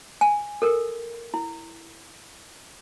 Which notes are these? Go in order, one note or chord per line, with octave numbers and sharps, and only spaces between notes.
G#5
A4 A#4
E4